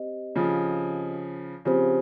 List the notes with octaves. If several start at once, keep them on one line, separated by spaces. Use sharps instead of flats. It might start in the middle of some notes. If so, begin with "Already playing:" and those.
Already playing: C4 G4 C5 D#5
C#3 F3
C#3 F3 C4 G4 C5